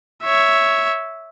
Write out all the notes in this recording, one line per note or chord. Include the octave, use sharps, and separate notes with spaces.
C#5 E5